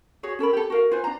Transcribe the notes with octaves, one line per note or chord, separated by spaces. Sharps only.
F#4 G#4 C#5
C#4 A4 A#4 B5
G4 A4
F#4 A#4 F5
F4 B4 C5 G#5
D4 A#5